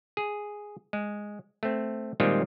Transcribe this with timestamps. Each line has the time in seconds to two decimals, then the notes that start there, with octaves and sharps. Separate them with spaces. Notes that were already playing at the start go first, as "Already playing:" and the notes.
0.17 G#4
0.93 G#3
1.63 A3 C4
2.20 A#2 D#3 G3 G#3 C4 F4